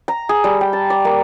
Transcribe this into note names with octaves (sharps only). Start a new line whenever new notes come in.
A#5
G#4
G3
G5
A5
D5
A#3